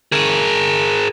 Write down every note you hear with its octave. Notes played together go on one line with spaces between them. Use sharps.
G#4 A#4